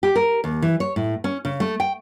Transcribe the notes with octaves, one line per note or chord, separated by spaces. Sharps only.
G4
A#4
D#2
E3
C#5
A2
C#4
C#3
A3
G5